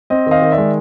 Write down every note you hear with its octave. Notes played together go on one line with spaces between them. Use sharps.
C4 D#5
D#3 D#5 F5
D#3
D5 E5
G#3